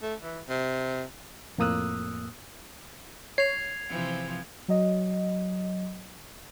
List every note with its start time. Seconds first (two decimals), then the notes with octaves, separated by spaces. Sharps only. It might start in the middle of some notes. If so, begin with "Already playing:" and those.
0.02 A3
0.22 E3
0.49 C3
1.58 F2 A2 A#3 D#6 E6 F#6
3.38 C#5 G#6 C7 F7
3.89 C3 E3 F3
4.68 F#3 D#5